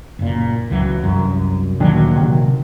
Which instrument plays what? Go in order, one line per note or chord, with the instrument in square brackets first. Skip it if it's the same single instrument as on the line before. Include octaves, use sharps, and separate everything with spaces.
[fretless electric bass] F#1 A#2
C#2 E3 F#3
C2 F#2
[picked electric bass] D2 D#3 D4 [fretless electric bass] A#2 F#3
[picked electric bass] C3 D#3